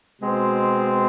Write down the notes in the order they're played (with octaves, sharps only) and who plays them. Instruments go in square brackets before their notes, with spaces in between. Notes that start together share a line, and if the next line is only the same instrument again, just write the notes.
[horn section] B2 G#3 C4